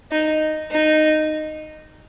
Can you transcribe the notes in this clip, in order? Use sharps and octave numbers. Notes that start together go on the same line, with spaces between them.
D#4
D#4